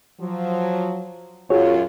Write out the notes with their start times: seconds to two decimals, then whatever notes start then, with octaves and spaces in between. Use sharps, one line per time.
0.20 F3 F#3
1.50 F#2 F4 F#4 G#4 C#5